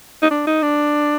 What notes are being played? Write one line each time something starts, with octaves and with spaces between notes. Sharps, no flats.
D#4
D4
D#4
D4